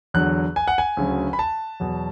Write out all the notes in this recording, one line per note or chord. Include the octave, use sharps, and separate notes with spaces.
E2 D3 F#3 F#6
G#5
F#5
G#5
D2 C#3 F#3
B5
A5
E2 B2 F#3